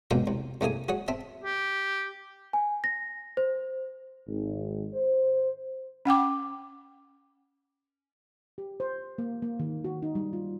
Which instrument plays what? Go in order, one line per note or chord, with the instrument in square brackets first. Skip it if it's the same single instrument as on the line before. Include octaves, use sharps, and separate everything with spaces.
[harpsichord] C#2 B2 F3 A#3 C4 G5
C2
C2 A3 A#3 G#4 G#5
F#4 G#4 C#5
C4 E5 A5
[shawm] G4
[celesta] G#5
A#6
C5
[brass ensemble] G#1
C5
[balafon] C#4 F#5 G5 D6
[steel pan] G4
C5
A#3
A#3
D#3
F#4
D#4
G3
F4